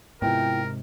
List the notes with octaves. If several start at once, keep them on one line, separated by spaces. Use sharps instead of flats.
G#2 C3 B3 E4 F4 A#4 G5